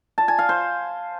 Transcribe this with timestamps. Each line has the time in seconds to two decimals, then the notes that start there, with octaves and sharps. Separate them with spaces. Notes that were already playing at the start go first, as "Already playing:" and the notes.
0.18 A5
0.28 G#5
0.39 F5
0.49 C5